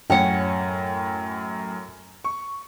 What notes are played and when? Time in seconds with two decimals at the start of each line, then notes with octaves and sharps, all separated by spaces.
0.10 F#2 A2 C#4 C#5 F#5 G5
2.24 C#6